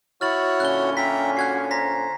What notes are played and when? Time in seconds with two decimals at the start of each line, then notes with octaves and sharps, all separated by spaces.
0.21 E4 F#4 C#5 F6 A6 F#7
0.60 A#2 D3 C#4 F#6 G7
0.97 E5 G5 A#5 B6
1.37 F#4 F#6 G#6 C7
1.71 C5 A#5 A#6 B6